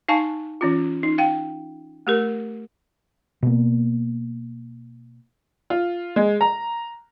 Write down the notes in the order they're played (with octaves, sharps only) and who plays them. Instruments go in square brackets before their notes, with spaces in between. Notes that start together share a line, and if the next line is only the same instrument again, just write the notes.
[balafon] D#4 F5 G#5 A5 C#6
E3 C#4 F4
D#4
F5 G5
A3 G4 A#4
[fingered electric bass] B2 A#3
[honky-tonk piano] F4
G#3
A#5